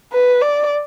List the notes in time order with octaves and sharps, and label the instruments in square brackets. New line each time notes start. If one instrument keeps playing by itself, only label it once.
[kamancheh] B4
D5